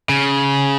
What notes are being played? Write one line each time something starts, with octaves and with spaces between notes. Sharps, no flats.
C#3